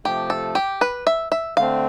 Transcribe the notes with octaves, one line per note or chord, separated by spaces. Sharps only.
C3 F3 A3 G4
A4
G4
B4
E5
E5
D3 A3 C4 F5